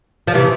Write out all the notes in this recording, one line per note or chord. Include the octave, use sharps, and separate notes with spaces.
F3
C3 E3